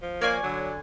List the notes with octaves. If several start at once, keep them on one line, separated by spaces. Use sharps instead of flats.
F3
A#3 C#5 D5 G#5
D3 F#3